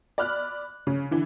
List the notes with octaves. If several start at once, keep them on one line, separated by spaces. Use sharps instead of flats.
D5 B5 F6 F#6
C#3
D3 E3